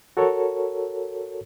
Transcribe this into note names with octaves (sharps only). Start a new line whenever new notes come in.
F#4 A4 A#4 C#5